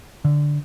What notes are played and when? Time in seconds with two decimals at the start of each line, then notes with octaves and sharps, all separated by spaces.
0.25 D3